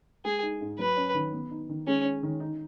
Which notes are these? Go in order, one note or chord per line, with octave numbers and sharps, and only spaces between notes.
G#3 G#4
D#4
G#2
F#3 B4
C#4
D#3
B3
D#4
D#3
G#3 C#4
C#4
D#3
D#4